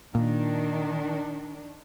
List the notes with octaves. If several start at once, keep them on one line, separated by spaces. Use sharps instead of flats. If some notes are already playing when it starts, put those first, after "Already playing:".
A#2 D#3 D4